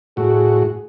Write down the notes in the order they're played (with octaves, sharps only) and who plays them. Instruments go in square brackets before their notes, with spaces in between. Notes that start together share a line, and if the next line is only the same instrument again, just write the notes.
[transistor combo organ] A2 F#4 [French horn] G#4